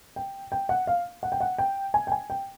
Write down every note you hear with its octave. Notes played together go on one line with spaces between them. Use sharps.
G5
G5
F#5
F5
F#5
G5
F#5
G5
G#5
G5
G#5
G5